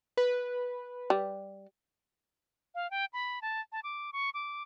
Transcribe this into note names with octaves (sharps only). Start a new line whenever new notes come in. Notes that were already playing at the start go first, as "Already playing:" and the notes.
B4
G3
F5
G5
B5
A5
A5
D6
C#6
D6